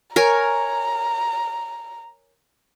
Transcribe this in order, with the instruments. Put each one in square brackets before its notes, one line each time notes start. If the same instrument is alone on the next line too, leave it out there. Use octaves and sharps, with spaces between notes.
[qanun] A#4 C#5 G#5 [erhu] A#5